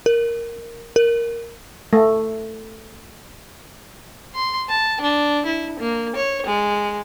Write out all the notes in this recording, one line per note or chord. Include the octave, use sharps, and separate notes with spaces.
A#4
A#4
A3
C6
A5
D4
E4
A#3
C#5
G#3